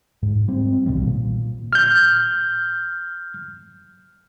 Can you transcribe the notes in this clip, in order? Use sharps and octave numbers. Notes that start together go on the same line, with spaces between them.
G#2
G3 C4
B1 B2 D#3 G3
A#2
F6 G6